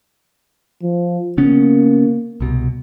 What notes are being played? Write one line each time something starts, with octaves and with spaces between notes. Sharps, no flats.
F3
C#3 A#3 B3 C#4
C2 B2